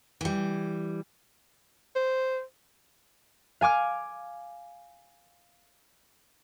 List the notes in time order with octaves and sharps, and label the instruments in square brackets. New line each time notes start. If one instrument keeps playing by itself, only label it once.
[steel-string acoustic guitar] E3 G3
[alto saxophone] C5
[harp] F5 G#5 D6 F6